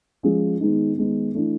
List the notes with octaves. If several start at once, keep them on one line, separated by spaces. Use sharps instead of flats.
F3 G#3 C#4 F4 G#4
D#3 G#3 B3 D#4
D#3 G#3 B3 D#4
E3 A3 D4